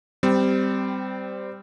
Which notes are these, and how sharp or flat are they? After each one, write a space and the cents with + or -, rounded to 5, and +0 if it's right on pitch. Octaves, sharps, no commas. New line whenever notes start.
G3 +0 C4 -20